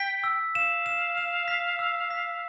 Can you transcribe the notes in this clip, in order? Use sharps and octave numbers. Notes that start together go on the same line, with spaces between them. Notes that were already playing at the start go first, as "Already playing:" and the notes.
Already playing: G5 B6
E6
F5 E7
E7
E7
B6
E6
B6